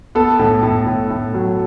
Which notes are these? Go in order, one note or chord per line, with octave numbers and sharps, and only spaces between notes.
B3 A4
A2
A2
A2
A2
F#3